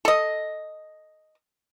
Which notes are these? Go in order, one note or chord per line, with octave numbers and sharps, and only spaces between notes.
A4 D#5